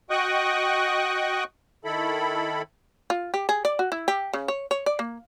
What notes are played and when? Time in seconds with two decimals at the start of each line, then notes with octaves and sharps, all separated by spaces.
0.10 F#4 D#5 G5 C#6 D#6 F#6
1.85 D#3 E4 A4 B5
3.10 F4
3.34 G4
3.49 G#4
3.65 D5
3.79 F#4
3.92 E4
4.08 G4
4.33 C#3
4.48 C#5
4.71 C#5
4.86 D5
4.99 A#3